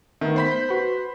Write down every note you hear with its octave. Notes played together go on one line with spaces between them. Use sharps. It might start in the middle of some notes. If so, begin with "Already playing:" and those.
D#3 A3 B3 D#4
C5 B5 B6
G6
F#4 B4